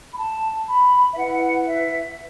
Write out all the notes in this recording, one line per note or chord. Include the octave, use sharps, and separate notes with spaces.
B5
A5
B5
E5
E4 B4 F#5
E5